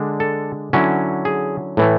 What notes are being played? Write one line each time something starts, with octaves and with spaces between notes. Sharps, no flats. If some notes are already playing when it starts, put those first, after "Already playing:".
Already playing: D3 G#3 D4
A4
D3 F#3 C#4 E4
G#4
A2 E3 A3